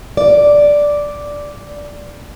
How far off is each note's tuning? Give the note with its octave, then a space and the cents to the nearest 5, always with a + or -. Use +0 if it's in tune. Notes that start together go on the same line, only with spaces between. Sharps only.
D5 -5